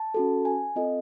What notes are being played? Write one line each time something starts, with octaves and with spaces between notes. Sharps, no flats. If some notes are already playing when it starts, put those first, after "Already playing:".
Already playing: A5
C#4 F#4 A4
G#5
C4 F4 A4 D#5